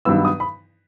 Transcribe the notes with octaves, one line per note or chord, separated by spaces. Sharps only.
G2 D#3 F#3 B3 E6
D#6
B5